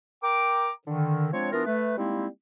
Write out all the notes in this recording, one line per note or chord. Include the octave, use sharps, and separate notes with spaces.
A#4 G5 A#5 D6
D3 D#3
F3 G#3 C4 D4 C#5
E3 B3 D4 F4 A#4
A3 B4
G3 G#3 A#3 C4 D#4 E4